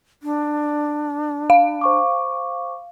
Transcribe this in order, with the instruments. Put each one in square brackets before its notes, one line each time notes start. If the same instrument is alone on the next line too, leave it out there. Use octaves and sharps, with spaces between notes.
[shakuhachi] D4
[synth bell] F5
[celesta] C5 C#6 D6